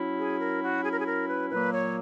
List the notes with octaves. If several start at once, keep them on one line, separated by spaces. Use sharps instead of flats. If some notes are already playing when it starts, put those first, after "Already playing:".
Already playing: F#3 C#4 E4
G#4
A#4
F#4
G#4
A#4
G#4
A#4
B4
A#2 F#3 A#3 B4
C#5